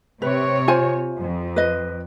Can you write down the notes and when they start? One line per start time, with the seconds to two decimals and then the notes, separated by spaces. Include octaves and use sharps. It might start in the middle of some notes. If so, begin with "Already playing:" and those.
0.22 C3 B4 C#5
0.68 F4 C5 G#5
1.19 F2
1.56 B4 D#5